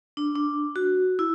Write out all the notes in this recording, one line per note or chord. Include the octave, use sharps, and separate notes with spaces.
D4
D4
F#4
E4